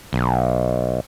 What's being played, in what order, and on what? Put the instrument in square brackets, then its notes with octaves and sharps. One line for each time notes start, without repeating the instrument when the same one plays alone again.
[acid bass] B1